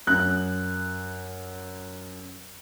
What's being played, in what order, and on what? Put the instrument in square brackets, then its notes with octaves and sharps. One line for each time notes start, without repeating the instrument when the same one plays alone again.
[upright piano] F#2 F#6